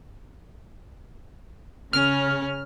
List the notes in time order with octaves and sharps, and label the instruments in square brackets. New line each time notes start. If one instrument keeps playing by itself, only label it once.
[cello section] C#3 [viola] C#4 [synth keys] F6